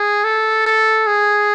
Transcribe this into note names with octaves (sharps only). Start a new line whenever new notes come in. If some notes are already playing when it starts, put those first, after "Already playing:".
Already playing: G#4
A4
A4
G#4